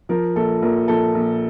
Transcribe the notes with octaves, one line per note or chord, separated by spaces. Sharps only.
F3 A#4
A#1 A4
A#1 A#4
A#1 A4
A#1